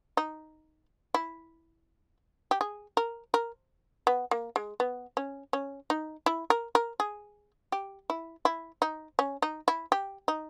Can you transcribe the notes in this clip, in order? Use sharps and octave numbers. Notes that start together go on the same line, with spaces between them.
D#4
E4
G4
G#4
A#4
A#4
B3
A#3
G#3
B3
C#4
C#4
D#4
E4
A#4
A#4
G#4
G4
E4
E4
D#4
C#4
D#4
E4
G4
D#4